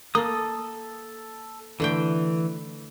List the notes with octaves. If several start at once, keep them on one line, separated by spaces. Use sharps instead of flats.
A#3 A4 D#6
D3 E3 A3 G5